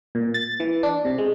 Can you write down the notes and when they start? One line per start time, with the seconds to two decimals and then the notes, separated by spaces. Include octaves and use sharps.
0.15 A#2
0.34 A6
0.60 E3
0.83 D4
1.05 C3
1.18 G#3